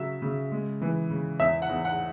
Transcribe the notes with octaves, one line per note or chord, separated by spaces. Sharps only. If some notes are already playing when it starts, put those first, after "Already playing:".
Already playing: C#3 F#3 E5
C#3
G#3
E3
C#3
E2 E5
F#5
E2
F#5